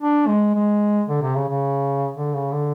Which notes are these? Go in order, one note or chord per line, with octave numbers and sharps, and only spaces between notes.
D4
G#3
G#3
D3
C3
C#3
C#3
D3
C#3
D3